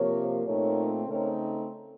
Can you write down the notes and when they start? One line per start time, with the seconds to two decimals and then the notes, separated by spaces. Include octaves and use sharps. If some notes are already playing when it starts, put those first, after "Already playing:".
Already playing: C3 F3 A#3 A#4 C#5
0.45 A#2 A3 C4 D#4 A#4 C#5
1.07 C#3 A3 C4 D#4 A#4 C#5